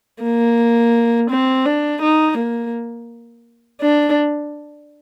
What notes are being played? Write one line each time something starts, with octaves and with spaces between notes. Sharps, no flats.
A#3
C4
D4
D#4
A#3
D4